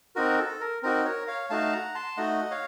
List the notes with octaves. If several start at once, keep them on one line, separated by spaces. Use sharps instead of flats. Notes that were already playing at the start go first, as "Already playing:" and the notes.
C4 D#4 F#4 A#4
A4
A#4
C4 D#4 F#4 A#4
A#4 C#5
C#5 F5
A3 D#4 F#4 F5 A5
F#5 A#5
A5 C6
A3 D#4 F#4 D#5 F#5
C#5 F5